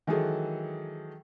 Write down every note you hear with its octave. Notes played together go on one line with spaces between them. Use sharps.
D#3 E3 F#3 G#3 G#4 A4